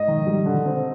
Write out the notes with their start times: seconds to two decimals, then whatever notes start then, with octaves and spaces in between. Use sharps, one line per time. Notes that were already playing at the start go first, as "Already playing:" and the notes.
Already playing: G#2 D#5
0.08 D#3
0.27 G3
0.46 D3
0.66 C4